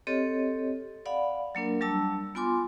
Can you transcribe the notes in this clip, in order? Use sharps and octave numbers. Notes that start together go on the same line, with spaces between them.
C4 G4 A4 C#5 D#5
D5 F5 F#5 B5
F#3 A#3 D4 A#4
F#3 G3 D4 A5 E6
B3 F4 G#5 C6 D6